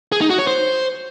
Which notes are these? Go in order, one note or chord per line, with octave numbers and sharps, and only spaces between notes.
G#4
D#4
F#4
C#5
C5